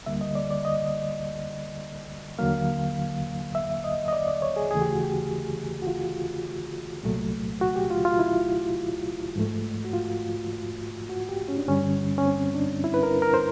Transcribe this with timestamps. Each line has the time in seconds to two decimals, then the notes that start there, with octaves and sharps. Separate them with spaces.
0.06 D2 D3 G3 A#3 E5
0.21 D#5
0.35 D5
0.51 D5
0.65 D#5
2.39 D#2 D3 F#3 A#3 F5
3.55 E5
3.84 D#5
4.08 D#5
4.13 D5
4.28 D5
4.42 C#5
4.56 G#4
4.71 D#2 C#3 E3 A3 G#4
4.82 G4
4.93 F#4
5.03 G4
5.82 F#4
5.87 F4
7.03 C2 A#2 F#3 A3
7.61 F#4
7.76 G4
7.90 F4
8.05 F4
8.19 E4
9.36 G#2 F3 A3
9.85 F#4
9.93 F4
11.10 F#4
11.29 G4
11.48 C#4
11.58 D4
11.68 G2 D3 G3 C#4
12.18 C#4
12.26 C4
12.54 D4
12.84 E4
12.94 B4
13.03 A#4
13.22 A#4
13.34 C5